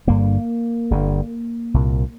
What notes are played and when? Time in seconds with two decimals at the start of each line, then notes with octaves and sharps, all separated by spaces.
0.07 G1 G2 D3 A#3
0.91 G1 G2 D3
1.74 C2 A#2